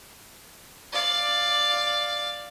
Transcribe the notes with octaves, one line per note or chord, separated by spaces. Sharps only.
D5 F5